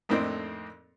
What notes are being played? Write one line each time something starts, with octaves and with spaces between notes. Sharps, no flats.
F2 A2 A#3 C4 D4 D#4